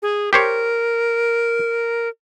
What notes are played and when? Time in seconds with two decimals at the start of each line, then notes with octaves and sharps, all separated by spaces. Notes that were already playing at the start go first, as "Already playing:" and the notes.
0.02 G#4
0.33 G4 A#4 C5 C#5